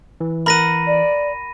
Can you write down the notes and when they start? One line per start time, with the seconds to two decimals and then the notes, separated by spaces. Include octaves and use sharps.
0.21 E3
0.46 A#4 F#5 B5 A#6 D#7
0.86 D5